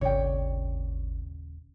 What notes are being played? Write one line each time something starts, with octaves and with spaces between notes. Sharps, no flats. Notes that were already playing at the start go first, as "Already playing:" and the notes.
D#1 G#1 C#3 C#5 D5 G5